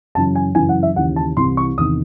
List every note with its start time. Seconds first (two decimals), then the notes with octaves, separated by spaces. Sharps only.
0.15 F#2 C#3 E3 A5
0.35 G#5
0.55 F#2 C#3 E3 G#5
0.69 F#5
0.83 E5
0.96 D#2 C#3 E3 F#5
1.16 A5
1.37 C2 C3 E3 C6
1.57 C#6
1.78 E2 C3 D#3 D#6